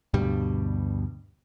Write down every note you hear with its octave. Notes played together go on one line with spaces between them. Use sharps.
D2 G2 B2 G3